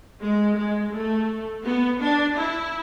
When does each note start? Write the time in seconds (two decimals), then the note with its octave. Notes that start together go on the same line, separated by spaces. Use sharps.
0.22 G#3
0.57 G#3
0.93 A3
1.65 B3
2.01 D4
2.37 E4